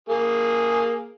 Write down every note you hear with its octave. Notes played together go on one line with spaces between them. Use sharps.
A#3 G#4